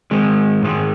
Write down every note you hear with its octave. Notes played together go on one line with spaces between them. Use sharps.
G#2 D#3 G#3
G#2 D#3 G#3